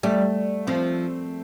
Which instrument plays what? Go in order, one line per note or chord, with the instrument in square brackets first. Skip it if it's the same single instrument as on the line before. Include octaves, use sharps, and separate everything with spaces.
[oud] G3 [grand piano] A3
[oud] F3 [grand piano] C4